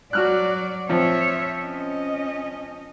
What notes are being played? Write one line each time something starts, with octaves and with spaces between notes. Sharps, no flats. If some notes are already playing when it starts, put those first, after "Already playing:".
F#3 F#4 D5 F6 F#6
F3 C4 C#5 E5
C#4 D#5